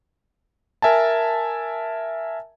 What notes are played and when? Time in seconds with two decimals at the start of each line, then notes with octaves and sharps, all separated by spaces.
0.82 A#4 E5 G#5 A5